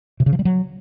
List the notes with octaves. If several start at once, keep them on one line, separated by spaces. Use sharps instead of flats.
C3
C#3
F3
G3
F#3